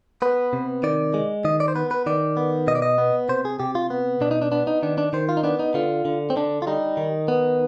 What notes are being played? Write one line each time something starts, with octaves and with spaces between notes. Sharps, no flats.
B3 B4
C3
D#3 D5
G#3
D#3 D#5
D5
C5
B3 B4
B4
D#3 D5
B3
B2 D#5
D5
D#5
B3
C3 C5
G#4
C3 G4
F4
B3
B2 D4
D#4
D4
B3 D4
D#4
D#3 D4
D4
D#3 C5
F4
D#4
B3 D4
D#4
D3 F4
D3
C4
D3 D4
F4
G3 D#4
D#3
B3